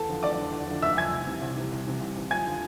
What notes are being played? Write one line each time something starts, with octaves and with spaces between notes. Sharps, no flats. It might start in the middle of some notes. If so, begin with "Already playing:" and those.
Already playing: E2 A4 A5
D3 F3
E2 D5 D6
D3 F3
E2
D3 F3
E2 E5 E6
D3 F3 G#5 G#6
C2
C3 E3
C2
C3 E3
C2
C3 E3
C2
C3 E3
F2 G#5 G#6
D3 F3